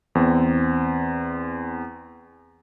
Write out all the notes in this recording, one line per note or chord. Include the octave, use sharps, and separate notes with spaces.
E2 C4